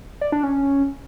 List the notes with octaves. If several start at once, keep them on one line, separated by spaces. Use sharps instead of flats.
D5
D4
C#4